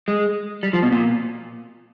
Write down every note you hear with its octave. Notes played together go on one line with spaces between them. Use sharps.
G#3
G3
F3
B2
A#2